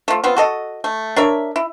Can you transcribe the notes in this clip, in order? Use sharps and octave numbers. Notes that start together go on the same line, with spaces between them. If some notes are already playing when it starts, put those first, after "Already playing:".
F3 A3
B3 C4 F4
F#4 A4 D#5
A3
D4 A#4 C#5 E5
E4